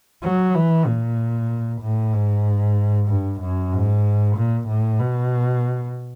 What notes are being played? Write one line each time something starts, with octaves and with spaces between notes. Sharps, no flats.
F#3
E3
A#2
A2
G#2
G2
F#2
G#2
A#2
A2
B2